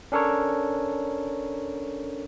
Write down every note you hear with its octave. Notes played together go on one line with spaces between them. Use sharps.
C#4 D4 A4 A#4 C#5